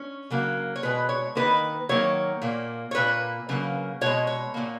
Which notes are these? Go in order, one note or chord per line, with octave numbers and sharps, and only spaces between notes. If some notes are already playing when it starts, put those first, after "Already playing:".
Already playing: C#4
C#3 F#3 A#3
C#5
B2 G#3 B4
C#5
D#3 A#3 B4
D#3 F#3 A#3 C#5
A#2 A#3
C#5
A#2 A#3 B4
C#3 F#3 A#3
B2 G#3 C#5
C#5
A#2 F#3 A#3